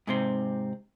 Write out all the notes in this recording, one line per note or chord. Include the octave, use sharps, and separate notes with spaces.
G#2 C3 C4